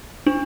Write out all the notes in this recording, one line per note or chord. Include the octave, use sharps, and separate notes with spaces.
D4